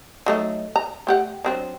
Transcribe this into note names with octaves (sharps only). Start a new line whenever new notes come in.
F#3 A3 D#4
A#5
A3 G4 F#5
F#3 C4 D4